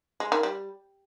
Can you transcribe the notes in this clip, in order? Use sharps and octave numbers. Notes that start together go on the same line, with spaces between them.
G#3
D#3
G3